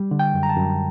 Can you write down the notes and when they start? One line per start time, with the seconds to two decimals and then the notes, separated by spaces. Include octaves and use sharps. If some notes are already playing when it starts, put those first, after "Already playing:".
Already playing: G3
0.11 D3
0.19 G5
0.34 F#2
0.43 A#5
0.49 A5
0.56 F#2